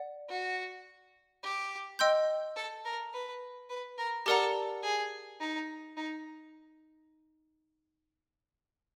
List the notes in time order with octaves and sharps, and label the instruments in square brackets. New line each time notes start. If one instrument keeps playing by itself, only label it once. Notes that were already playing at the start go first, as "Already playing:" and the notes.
Already playing: [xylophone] D5 F#5
[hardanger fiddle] F#4
G4
[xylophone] D#5 G5 C6 E6 G6
[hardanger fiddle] A4
A#4
B4
B4
A#4
[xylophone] G4 A#4 D5 F#5 A#5 [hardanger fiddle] A4
[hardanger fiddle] G#4
D#4
D#4